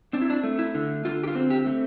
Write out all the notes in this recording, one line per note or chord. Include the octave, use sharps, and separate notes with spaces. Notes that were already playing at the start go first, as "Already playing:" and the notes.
C4 D4
E4
D4
A3
E4
D3
D3 F4
G4
F4
C4
G4
A3